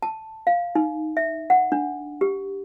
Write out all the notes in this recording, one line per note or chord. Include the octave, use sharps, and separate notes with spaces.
A5
F5
D#4
E5
F#5
D4
G4